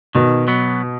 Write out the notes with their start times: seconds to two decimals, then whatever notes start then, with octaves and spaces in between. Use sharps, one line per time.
0.15 B2 D#3
0.48 F#3 B3